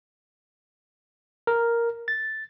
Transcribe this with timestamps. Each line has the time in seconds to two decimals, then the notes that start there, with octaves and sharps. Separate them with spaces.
1.47 A#4
2.08 A6